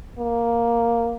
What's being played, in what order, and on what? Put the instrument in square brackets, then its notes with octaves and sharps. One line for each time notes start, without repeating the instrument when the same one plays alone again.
[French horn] A#3